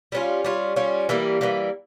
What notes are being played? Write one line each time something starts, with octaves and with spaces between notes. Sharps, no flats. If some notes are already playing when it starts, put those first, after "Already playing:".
G3 C#4 F4
G3 C#4 F4
G3 C#4 F4
E3 G3 A#3
E3 G3 A#3